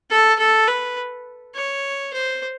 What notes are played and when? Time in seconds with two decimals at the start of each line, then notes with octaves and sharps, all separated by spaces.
0.10 A4
0.39 A4
0.68 B4
1.54 C#5
2.13 C5